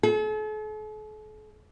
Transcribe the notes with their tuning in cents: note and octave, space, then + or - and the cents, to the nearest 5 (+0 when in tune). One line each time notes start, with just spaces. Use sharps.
A4 -45